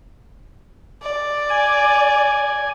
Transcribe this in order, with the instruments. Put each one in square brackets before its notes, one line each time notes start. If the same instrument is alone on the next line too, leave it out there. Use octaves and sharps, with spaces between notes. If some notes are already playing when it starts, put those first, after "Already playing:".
[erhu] D5
[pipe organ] G#5